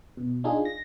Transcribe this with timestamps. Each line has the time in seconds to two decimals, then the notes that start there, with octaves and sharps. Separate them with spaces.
0.17 B2
0.44 D4 D#4 F4 G#4
0.65 A#6